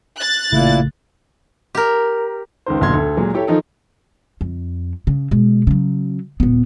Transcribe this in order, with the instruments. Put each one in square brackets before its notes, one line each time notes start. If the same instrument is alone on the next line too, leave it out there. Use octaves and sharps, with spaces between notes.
[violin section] F#6 A6
[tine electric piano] A1 C#3 A3 [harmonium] A#2 A#3 E4
[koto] G4 A#4
[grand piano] C#2 D#3 C5
D1 B1 A#2 C6 G#6
D2 A4
A#2 F#3 G#3
E4 G4 A4 C#5
D#3 F3 D#4 A4
[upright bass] F2
C#3
B2 G#3
C#3 F#3
D#1 B3